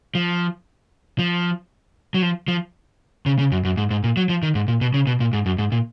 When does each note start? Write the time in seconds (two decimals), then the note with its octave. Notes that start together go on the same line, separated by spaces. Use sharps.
0.15 F3
1.19 F3
2.14 F#3
2.22 F3
2.48 F3
3.26 C#3
3.39 C#3
3.52 F#2
3.65 F#2
3.77 G#2
3.91 G#2
4.04 A#2
4.17 F#3
4.29 F3
4.43 D#3
4.55 G#2
4.68 A#2
4.81 B2
4.94 C#3
5.07 B2
5.20 A#2
5.33 G#2
5.46 F#2
5.58 G#2
5.72 A#2